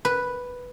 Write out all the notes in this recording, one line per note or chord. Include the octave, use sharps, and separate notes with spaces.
B4